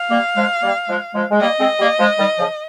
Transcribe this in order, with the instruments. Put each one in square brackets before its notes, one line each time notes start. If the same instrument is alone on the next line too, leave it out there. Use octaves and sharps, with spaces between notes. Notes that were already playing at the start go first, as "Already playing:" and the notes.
Already playing: [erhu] F5
[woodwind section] G3 A#3
F3 G#3
G3 A#3
F3 G#3
F3 G#3
G#3
[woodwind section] G3 A#3 [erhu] D#5
[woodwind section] G#3 C4
G3 A#3
F3 G#3
D#3 G3
C#3 F3